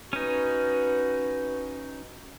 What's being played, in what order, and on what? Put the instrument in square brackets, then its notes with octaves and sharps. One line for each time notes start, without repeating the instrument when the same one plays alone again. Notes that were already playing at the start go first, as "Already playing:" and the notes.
[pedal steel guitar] C#4 D#4 [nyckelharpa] F#4 B4